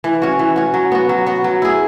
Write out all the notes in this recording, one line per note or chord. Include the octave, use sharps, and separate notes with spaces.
E3
C#4 F#4
E3
C#4 F#4
F#3
B3 F#4
F#3
B3 F#4
F#3
E4 G#4